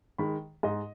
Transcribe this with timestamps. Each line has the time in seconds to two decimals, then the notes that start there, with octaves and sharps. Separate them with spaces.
0.18 D#3 G#3 B5
0.63 G#2 D#5